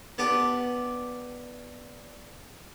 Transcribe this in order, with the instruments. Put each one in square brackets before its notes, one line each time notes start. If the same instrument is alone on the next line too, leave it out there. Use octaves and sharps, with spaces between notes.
[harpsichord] B3 D4 G4